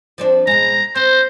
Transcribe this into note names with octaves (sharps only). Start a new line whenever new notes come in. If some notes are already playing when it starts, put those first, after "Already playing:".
F3 C4 D4
B2 G#3 A#5
C4 C5